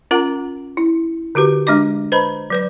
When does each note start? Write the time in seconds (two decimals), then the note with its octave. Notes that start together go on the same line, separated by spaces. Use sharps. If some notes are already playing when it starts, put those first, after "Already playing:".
0.11 C#4 F4 A#4 F#5 A#5
0.77 E4
1.35 D3 F#4 G4 B4
1.67 G#3 D4 D#5 D6
2.12 B4 C5 D#5 A#5 B5
2.50 F#3 B4 D5